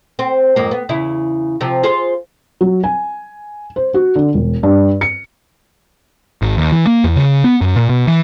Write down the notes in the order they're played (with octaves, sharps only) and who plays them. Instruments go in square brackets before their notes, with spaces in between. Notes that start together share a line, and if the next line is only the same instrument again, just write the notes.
[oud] C4
F2 G#2 A#3
B3
E2 C#3 E4
C3 F3
F4 G#4 C5
[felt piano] F#3
G#5
C5
F#4
D3
E1
G2
C#7
[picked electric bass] G#1
D#2
E3
A#3
E2
C#3
B3
F#2
A#2
B2
E3